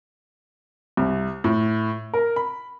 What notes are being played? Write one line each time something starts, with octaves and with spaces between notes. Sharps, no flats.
C2
A2
A#4
B5